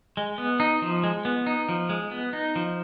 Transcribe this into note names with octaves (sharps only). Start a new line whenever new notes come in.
G#3
B3
D#4
F3
G#3
B3
D#4
F3
G#3
B3
D#4
F3